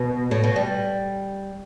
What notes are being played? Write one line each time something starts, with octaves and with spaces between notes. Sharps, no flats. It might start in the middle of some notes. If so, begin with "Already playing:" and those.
Already playing: B2
A2
B2
G3